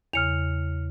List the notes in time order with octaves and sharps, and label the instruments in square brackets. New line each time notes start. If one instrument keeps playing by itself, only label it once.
[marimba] E2 C#3 [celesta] F6 C#7 F7